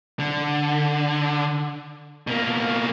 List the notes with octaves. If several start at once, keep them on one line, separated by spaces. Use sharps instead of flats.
D3
B2 A#3